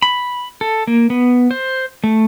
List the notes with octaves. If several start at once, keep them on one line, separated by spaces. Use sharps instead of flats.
B5
A4
A#3
B3
C5
A3